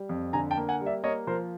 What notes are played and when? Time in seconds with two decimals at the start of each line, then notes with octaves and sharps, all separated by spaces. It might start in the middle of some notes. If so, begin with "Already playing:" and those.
Already playing: G3
0.09 F2
0.33 D3 G#5 A#5
0.51 G5 A5
0.57 A#3
0.69 F#5 G#5
0.81 G3
0.86 D5 E5
1.04 A#3 C#5 D#5
1.27 F3 A#4 C5